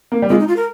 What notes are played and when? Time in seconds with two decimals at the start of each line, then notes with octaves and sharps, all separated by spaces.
0.12 A#3
0.22 G3
0.29 G#3 F4
0.39 D#4
0.48 F4
0.57 A#4